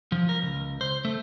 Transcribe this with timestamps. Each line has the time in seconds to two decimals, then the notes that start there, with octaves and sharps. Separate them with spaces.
0.12 F3
0.29 A#4
0.42 C#2
0.81 C5
1.05 A3